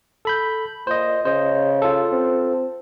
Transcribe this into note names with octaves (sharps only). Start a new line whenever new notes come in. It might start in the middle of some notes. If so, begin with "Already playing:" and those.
A4 B5 G6
A#2 C5 D#5
C#3 C5 D#5
F4 A4
C4